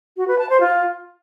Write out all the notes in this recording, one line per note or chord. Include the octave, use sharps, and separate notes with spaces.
F#4
B4
A5
C5
F4